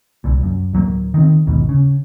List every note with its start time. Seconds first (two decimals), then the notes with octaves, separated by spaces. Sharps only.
0.24 C2 A#2
0.43 F#2
0.73 D1 F#3 G3 A#3
1.14 D#3 C4
1.47 A1 D#2 G#2 B2
1.69 C#3